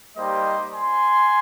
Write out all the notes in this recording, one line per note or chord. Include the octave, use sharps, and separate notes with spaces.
G3 A#3 D#4 G4 C5 D#5
G#5 C6